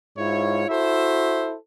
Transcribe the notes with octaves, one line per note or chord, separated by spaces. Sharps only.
G#2 E4 F4 C#5
E4 F#4 A4 C5 E5